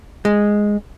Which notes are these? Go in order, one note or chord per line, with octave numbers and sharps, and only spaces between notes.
G#3